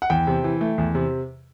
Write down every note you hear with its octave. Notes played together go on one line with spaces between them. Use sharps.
F#5
E2 G5
C3
E3
A3
E2
C3